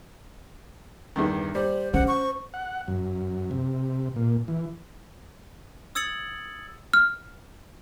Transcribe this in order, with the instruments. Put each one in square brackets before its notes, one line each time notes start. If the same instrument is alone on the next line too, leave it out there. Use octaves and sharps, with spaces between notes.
[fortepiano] E2 G2 D#3
[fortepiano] G3 [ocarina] C5
[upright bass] C#4 [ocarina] C5 [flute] F#5
[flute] C#6
[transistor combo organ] F#5
F#2
C3
A#2
E3
[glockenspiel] D#6 E6 G#6 A6 C#7 F#7
[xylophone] F6